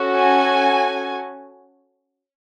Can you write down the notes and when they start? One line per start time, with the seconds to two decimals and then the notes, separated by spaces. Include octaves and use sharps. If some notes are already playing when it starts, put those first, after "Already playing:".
Already playing: C#4 F#4 A4
0.18 G#5